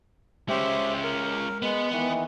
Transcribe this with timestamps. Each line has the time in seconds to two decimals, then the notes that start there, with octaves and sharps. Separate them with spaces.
0.49 G#3 C#4 G4 C5 E5
1.04 A#4
1.62 G#3 B3
1.92 D#3 E3